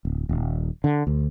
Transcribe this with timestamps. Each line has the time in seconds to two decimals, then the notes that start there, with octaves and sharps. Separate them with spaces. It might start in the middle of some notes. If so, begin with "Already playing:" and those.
0.05 D1
0.29 D#1
0.84 D3
1.07 D2